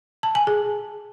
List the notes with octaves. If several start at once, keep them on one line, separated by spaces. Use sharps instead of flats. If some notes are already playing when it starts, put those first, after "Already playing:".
A5
G#5
G#4